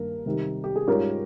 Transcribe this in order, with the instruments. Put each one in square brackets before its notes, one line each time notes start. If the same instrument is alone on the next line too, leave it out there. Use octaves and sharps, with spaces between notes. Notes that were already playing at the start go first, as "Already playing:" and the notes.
Already playing: [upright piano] G2 D#3 A#3 A#4
C3 D#3 G3
G4
G#4
G#2 G3 C#4 F4 G4 A#4